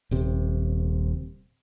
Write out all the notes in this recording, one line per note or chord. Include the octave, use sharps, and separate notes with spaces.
D#1 C3